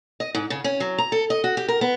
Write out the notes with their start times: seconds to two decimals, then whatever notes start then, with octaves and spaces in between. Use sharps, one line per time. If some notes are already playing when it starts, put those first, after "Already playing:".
0.20 D#5
0.35 G#2
0.50 C#3
0.64 C#4
0.80 F#3
0.98 A#5
1.12 A4
1.30 D#5
1.44 F#4
1.57 G4
1.68 A#4
1.81 B3